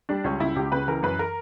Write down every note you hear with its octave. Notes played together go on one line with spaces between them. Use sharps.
G3 D4
C#2 C#4
C#3 E4
C#2 G4
C#3 B4
E3 A#4
F#2 B4
A#4